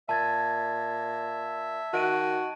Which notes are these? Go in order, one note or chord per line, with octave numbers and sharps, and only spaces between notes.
A#2 E5 A5 G#6 A6
D#3 F#4 A5 D7 D#7